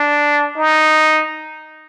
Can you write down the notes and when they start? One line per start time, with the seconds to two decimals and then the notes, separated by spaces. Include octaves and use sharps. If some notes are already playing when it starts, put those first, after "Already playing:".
Already playing: D4
0.57 D#4